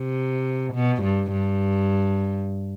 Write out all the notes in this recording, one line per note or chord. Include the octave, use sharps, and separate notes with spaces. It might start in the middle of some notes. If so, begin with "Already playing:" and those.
Already playing: C3
B2
G2
G2